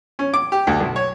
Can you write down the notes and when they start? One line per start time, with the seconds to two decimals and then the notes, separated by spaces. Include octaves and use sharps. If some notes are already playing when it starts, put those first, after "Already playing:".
0.19 C#4
0.34 D6
0.52 G4
0.67 D2
0.80 B1
0.96 C#5